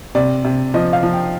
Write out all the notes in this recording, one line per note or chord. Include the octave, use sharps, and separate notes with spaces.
C3 D5
C3
F3 D#5
F5
F3
G5